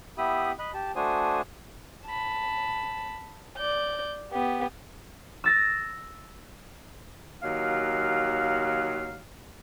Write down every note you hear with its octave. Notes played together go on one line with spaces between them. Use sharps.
B3 E4 G4 E5 B5 D#6
D#5 B5 F#6
G4 A5
A3 D4 F#4 C5 G#5 D#6
A5 B5
D5 G6
B3 G4
E6 A6 A#6
D#2 F#3 F5